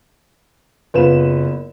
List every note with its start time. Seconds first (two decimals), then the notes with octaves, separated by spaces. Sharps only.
0.94 F#1 B3 F4 B4 E7